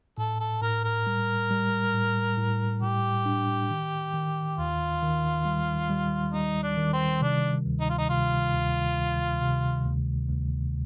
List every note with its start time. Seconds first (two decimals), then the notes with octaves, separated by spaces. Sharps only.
0.18 A2 A4
0.40 A4
0.62 A2 A#4
0.84 A#4
1.07 G3
1.51 G3
1.94 A2
2.38 A2
2.82 A2 G4
3.26 D4
3.70 D#3
4.14 D#3
4.58 D#2 F4
5.02 D#3
5.45 G3
5.90 G3
6.34 G3 D#4
6.63 D4
6.77 D#3
6.93 C4
7.21 C3 D4
7.66 D2
7.80 D#4
7.90 F4
7.98 D#4
8.09 C3 F4
8.54 D2
8.97 D2
9.41 C3
9.86 D2
10.29 D2